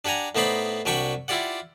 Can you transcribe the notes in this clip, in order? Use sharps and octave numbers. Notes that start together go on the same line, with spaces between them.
D4 G4 F#5 G#5 A#5
A2 B3 D#4 C5 D5 B5
C2 F#3 D4 G5 B5 C#6
E4 F4 G4 D5 F#5